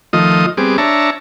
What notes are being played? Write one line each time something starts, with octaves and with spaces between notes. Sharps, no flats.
D#3 F3 A3 F4 D#5 D#6
G3 B3 C4 G#4 D6
D4 C#5 E5 A5 A#5